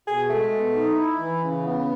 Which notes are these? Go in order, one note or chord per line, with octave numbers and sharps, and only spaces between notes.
B2 G#4
G#3 A3
B2
D#4
E4
E3
C#3
B3